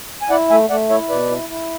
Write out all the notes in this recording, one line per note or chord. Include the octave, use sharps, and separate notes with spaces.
G#5
E4 D5 F#5
A3 E5 G#5
A3 D5 F#5
E4 C#5 E5
B2 B4 D5
E4
E4